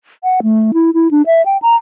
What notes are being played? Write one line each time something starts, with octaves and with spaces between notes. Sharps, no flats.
F#5
A3
E4
E4
D4
E5
G5
A#5